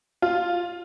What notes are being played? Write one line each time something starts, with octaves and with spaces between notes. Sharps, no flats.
F4